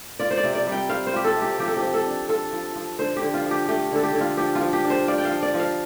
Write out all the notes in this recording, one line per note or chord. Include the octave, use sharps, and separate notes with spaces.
F4 D5
C5
D5
C3
D5
G3
G5
C4 F5
C5
F4 G4
A4
C3
G4
F3 G4
A4
G4
F3
A4
D4
F4 A4
F3
F3
D3 C5
G4
D3
F4
F3
G4
A3 G4
D3 A4
G4
D3
F4
F3 G4
F4
F3
G4
D4
C5
F4 D5
G5
F5
F3
D5
F3
F5